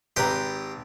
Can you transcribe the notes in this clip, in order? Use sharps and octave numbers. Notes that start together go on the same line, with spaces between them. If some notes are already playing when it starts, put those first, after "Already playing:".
G#1 G4 B4 A#5 C6 D#6